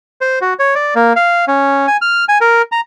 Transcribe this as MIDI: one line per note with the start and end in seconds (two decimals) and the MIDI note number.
0.21 0.39 72
0.41 0.54 66
0.59 0.74 73
0.75 0.94 74
0.95 1.13 58
1.16 1.45 77
1.48 1.87 61
1.88 1.97 80
2.02 2.25 89
2.29 2.38 80
2.41 2.62 70
2.72 2.81 82